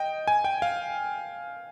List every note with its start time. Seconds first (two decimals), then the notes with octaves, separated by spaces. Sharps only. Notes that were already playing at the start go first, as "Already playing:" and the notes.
Already playing: D#5 G5
0.28 G#5
0.44 G5
0.62 F5